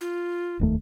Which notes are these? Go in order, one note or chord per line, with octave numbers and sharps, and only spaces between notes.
F4
F1 D#2 A3